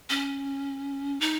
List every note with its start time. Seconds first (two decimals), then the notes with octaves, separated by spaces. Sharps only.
0.10 C#4
1.21 D#4